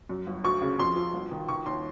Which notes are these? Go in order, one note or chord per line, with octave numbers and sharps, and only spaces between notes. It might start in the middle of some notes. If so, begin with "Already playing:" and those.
F#2
G1
D2 C#6
C#3
F2 C6
F3
G1
D#3
D#3 C#6
D#2 C6